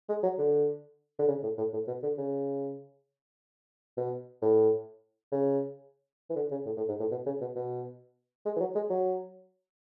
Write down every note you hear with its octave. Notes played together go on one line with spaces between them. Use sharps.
G#3
F#3
D3
D3
C#3
A2
A2
A2
B2
D3
C#3
B2
A2
C#3
E3
D3
C#3
A2
A2
G#2
A2
B2
C#3
B2
B2
G#3
E3
F#3
G#3
F#3